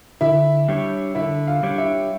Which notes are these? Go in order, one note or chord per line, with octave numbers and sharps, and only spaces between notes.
D3 E4 E5
G3 D4 G4 C#5
D3 E4 E5
F4 F5
G3 D4 G4 C#5
E4 E5